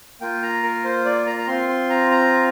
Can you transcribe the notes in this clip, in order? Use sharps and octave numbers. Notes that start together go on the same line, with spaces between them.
A#3 F4 G5
A#5
A#4
C5
D5
A#5
A#5
C4 F4 C6
C6
A#5
A#5